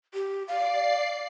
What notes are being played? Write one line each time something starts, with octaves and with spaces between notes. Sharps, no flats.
G4
D5 F5 C7